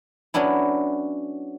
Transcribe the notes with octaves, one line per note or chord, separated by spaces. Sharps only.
F#3 B3 C#4 D4 E4